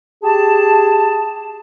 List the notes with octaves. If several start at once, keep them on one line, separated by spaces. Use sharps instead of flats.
G4 G#4 A5